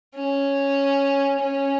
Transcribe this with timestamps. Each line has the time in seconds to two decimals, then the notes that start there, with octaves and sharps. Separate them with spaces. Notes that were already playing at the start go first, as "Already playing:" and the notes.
0.15 C#4
1.39 C#4